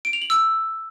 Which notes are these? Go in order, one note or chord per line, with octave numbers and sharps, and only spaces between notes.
D7
F7
F#7
E6